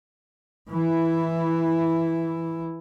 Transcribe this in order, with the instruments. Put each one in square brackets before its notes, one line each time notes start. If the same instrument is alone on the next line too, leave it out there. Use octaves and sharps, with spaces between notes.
[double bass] E3 E4